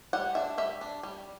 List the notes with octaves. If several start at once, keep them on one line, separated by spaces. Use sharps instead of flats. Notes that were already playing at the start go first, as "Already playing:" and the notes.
G3 F#5
D4 E5
G3 E5
D4
G3